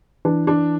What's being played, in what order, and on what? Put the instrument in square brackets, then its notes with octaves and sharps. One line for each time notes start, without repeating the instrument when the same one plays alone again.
[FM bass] E3 [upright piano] D4
[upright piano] D4